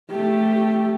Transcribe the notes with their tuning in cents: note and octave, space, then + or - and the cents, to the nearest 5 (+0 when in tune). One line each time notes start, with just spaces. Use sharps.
A3 +0 G4 -5